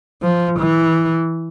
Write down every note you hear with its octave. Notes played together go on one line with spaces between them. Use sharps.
F3
E3